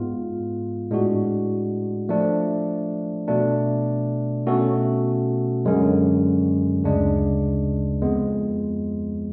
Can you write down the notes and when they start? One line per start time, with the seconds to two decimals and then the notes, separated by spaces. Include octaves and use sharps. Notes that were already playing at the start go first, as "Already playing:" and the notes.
Already playing: G#2 G#3 B3 F4
0.91 A2 G#3 D4 F#4
2.09 F3 A3 D4
3.28 B2 A3 D4
4.46 B2 A3 C#4 F#4 A4
5.65 F#2 D3 G#3 C#4
6.83 D2 C#3 G#3 D4
8.02 F2 F3 G#3 B3